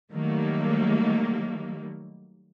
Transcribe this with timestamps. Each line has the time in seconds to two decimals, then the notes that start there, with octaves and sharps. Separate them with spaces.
0.13 D#3 F#3 G3 A3 A#3